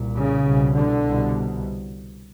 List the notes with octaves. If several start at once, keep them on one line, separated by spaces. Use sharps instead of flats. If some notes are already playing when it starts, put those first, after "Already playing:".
Already playing: C2 A#2
C#3
C2 B2
D3
C2
B2